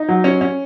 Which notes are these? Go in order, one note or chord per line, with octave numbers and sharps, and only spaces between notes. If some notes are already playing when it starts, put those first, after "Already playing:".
Already playing: D#4
F#3
C#4
C#4